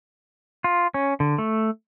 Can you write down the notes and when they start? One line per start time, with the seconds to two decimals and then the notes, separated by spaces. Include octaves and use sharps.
0.64 F4
0.94 C#4
1.20 D3
1.38 A3